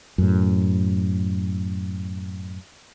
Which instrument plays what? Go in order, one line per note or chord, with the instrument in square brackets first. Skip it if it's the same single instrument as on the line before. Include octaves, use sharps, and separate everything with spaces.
[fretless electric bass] F#2 A2